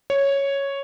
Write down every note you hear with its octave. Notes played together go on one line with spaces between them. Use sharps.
C#5